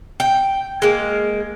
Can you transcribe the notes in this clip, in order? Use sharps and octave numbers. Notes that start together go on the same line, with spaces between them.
G5
G#3 A#3